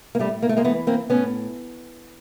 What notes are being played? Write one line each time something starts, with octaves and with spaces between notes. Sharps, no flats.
A#3
A2 G3 A3
A#3
A3
G#3 A#3
E3 A3 B3
A#3 C4
A2 B3 C#4